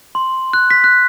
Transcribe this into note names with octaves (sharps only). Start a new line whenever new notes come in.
C6
F#6
B6
F#6